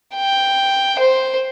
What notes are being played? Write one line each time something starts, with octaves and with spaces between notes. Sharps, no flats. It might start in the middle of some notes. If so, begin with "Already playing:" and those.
G5
C5